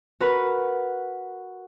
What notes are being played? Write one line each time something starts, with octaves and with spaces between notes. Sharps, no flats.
F#4 A#4 B4 B5